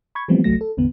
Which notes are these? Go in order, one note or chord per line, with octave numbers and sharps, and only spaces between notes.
B5 C#6 G#6
E3 F3 G3 A3 B3 C4
G1 C2 F#3 A3 A#6
A4
G#1 E2 D3 B3